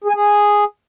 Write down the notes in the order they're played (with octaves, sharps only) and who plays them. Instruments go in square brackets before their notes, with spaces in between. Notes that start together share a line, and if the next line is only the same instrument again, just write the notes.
[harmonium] G#4
G#5
G#4